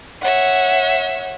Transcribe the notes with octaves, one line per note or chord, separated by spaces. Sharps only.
C#5 E5 F#5